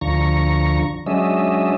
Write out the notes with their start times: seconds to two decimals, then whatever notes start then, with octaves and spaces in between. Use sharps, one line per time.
0.01 D2 D3 F3 A#5 C#6
1.06 F#3 G#3 C#4 D4 D#5 E5